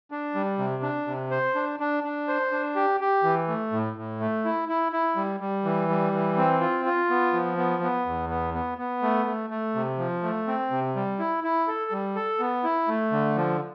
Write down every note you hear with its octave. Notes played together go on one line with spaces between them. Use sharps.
D4
G3
C3
D4
C3
C5
D4
D4
D4
C5
D4
G4
G4
E3
A3
A2
A2
A3
E4
E4
E4
G3
G3
E3
G3
E3
C4
F4
F4
B3
F3
B3
B3
E2
B3
B3
B3
A3
A3
A3
C3
F3
A3
C4
C3
G3
E4
E4
A4
G3
A4
B3
E4
A3
D3
F3